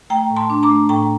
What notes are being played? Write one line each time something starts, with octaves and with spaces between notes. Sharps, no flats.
A3 G5 A#5
A2
A5 C6
D4
A#5 D6
A3
A2 G5 A#5